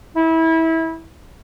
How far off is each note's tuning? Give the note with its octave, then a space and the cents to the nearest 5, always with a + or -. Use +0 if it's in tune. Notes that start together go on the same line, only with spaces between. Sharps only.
E4 -25